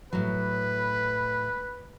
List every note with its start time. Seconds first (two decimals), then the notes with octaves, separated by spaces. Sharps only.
0.13 A2 F#3 B4